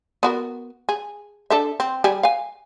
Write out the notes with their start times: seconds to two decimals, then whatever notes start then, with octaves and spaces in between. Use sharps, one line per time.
0.23 B3 F#4 A#4
0.89 G#4
1.50 D4 A4 E5
1.80 C4
2.04 G3 G4 G#4
2.23 F5 G#5